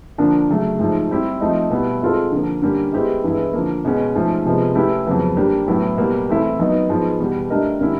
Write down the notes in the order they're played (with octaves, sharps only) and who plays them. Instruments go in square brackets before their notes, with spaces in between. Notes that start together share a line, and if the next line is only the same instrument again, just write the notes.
[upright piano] D3 F3 A#3 D4
C#3 F#3 A3
G#2 F3 A3
G3 C4 E4 G4
F3 A3 C4 D#4
B2 G3 B3 E4
G#3 C4 F4 A4
D3 F3 A#3
D3 G3 A#3 C#4
G#3 B3 E4 G4 C5
G2 E3 G#3 B3 E4
D3 F3 A#3
B2 G#3 C#4
G#2 F3 A3 C#4
C3 F3 G#3 B3
A3 C#4 E4 G4 B4
F2 C#3 F#3 B3
G3 A#3 D4 G4
A2 F#3 B3 E4
B2 G3 A#3
E3 A3 C4 E4 A4
D#3 F#3 B3 D#4
G#2 F3 G#3 B3
E2 B2 G3
A3 D4 G4 A#4 D#5
D3 G3 A#3 C#4 E4